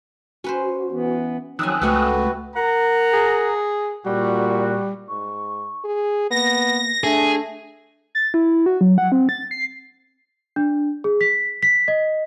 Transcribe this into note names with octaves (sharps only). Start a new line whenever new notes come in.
C#4 F#4 B4 C5
E3 B3
F2 D#3 F#3 A3 G#5 D#6 E6 F#6
C#2 A3 F#4 G4 B4 F#5 G#5
A#4 F#5 A#5
G#4
A#2 G3 F#4
G#2 C#6
G#4
A#3 B3 A#6
A3 D4 G#4
A6
E4
F#4
F#3
F#5
C4
A6
C7
D4
G#4
B6
B6
D#5